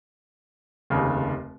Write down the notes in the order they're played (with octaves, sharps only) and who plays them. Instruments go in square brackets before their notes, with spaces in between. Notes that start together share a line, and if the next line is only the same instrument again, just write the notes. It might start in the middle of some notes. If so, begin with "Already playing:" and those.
[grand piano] F1 D#2 C#3